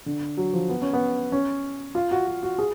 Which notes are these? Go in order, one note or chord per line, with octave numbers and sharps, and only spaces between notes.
D3
F#3
F3
B3
C#4
B3
C#4
F4
F#4
F#4
F#4
G#4